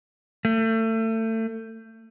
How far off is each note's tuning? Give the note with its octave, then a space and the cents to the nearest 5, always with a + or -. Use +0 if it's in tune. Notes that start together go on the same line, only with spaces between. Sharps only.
A3 +30